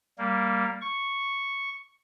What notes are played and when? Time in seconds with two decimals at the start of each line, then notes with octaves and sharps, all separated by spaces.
0.18 G3 A#3
0.81 C#6